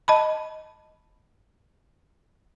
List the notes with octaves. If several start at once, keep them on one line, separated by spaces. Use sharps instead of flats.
D#5 A5 B5